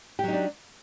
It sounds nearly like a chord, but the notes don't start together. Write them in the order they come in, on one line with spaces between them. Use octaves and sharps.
G4 F#3 D#4 D4